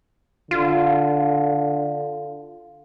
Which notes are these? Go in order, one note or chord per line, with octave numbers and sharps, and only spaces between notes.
D3 F4